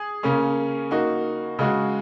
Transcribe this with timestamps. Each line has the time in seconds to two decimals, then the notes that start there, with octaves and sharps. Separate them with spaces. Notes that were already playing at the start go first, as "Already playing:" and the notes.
Already playing: G#4
0.23 C#3 A#3 C#4
0.91 A#3 D#4 F#4
1.59 C#3 G#3 F#4